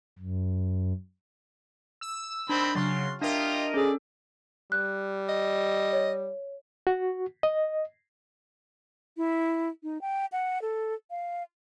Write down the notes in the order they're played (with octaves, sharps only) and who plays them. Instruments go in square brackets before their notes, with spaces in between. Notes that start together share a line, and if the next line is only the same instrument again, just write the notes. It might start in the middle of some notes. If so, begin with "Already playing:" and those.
[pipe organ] F#2
[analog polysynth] E6
[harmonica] D#3 C4 B5 [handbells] D4
[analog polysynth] C#3 F#3 [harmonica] C6 [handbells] F6 A6
[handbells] D4 E5 [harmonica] F4 G4 [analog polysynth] A#4 D#5
[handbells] C#4 A4 [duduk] G#4 [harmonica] D5
[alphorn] G3 [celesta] F#6
[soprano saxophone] D#5
[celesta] C#5
[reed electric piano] F#4
D#5
[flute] E4
D#4
G5
F#5
A4
F5